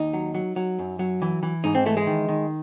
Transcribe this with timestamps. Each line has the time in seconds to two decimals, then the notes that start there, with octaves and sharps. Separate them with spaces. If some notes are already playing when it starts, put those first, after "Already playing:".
Already playing: D#2 D#4
0.13 F#3
0.35 F#3
0.56 F#3
0.79 F#2
0.99 F#3
1.22 E3
1.43 E3
1.64 G#2 D#4
1.75 C4
1.86 E3 A3
1.97 G#3
2.06 D#3
2.29 D#3